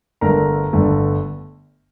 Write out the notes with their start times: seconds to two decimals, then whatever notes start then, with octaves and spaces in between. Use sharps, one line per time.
0.21 G1 G2 D3 A3 A#4 A#5
0.73 G1 G2 D3 A3